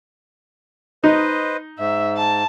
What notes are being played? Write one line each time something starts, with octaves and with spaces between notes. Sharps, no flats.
D#4 B4 C5 D#5
G#2 E5
A5